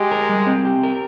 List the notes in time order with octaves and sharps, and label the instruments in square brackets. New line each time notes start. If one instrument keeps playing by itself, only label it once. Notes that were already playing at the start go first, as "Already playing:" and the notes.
Already playing: [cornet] G#3 [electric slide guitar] G4
[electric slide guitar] A#4
G3
C4
G4
A#4